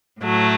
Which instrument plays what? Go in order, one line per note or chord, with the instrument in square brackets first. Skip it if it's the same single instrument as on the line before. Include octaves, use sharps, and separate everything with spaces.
[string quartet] A2 F#3 A3